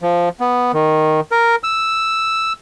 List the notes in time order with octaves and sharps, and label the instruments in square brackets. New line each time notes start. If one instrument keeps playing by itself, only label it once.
[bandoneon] F3
B3
D#3
A#4
E6